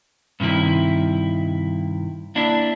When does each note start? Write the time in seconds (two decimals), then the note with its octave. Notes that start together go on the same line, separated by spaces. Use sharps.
0.40 G2 C3 D#3 E4
2.35 A#3 D4 E4 E5